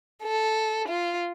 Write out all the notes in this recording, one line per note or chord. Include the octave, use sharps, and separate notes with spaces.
A4
F4